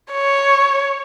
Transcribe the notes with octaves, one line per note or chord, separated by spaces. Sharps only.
C#5